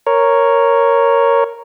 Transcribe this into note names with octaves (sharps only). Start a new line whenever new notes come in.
A#4 C#5